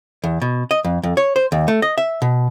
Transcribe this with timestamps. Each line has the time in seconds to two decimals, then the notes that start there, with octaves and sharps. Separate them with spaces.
0.24 E2
0.42 B2
0.71 D#5
0.85 F2
1.03 F2
1.17 C#5
1.36 C5
1.52 D#2
1.68 A3
1.82 D#5
1.98 E5
2.22 B2